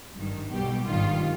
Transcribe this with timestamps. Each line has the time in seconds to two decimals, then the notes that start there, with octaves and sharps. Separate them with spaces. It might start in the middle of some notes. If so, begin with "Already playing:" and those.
0.14 G#1 G2 D#3
0.50 B1 B2 G3 G4
0.87 G#1 G2 D#3 G3 F4